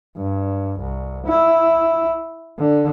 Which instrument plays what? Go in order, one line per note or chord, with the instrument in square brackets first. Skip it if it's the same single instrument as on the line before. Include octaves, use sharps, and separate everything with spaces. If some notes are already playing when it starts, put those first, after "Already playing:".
[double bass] G2
C2
E4
D3